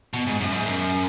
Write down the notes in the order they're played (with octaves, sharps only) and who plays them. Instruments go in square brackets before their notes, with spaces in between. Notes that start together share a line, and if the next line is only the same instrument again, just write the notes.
[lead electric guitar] B2
G#2
F#2
G#2
F#2